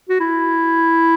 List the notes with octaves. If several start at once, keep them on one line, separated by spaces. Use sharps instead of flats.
F#4
E4